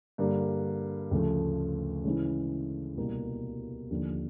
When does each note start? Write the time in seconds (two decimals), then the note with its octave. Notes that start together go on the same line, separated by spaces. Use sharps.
0.18 G2 D3 G3 A#3
1.11 D2 C#3 F3 A3
2.04 C#3 E3 G#3 C#4 E4
2.97 C2 B2 G3 A#3
3.91 D#2 D3 F3